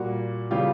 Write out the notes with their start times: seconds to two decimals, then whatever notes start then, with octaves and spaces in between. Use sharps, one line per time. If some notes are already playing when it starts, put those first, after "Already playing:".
Already playing: A#2 G3 A#3 F#4
0.51 C#3 E3 G3 F4 G4